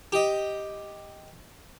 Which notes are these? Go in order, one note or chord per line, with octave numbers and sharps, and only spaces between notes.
G4 D#5